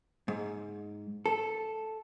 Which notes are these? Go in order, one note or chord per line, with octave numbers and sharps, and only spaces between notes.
G#2
A4